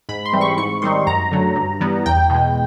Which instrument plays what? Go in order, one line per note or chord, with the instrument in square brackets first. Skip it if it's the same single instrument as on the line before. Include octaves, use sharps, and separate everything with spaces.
[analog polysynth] G#2 B5
C6
E3 G3 C4
C#6
G#2 C#6
D#3 G3 C4 D#4 C6
F#2 A#5
D3 F#3 A3
G2
E3 G3 B3
E2 G5
B2 G#3